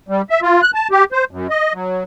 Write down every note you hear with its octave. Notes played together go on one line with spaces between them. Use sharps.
G3
E5
F4
F#6
A5
G4
C5
F#2
D#5
F#3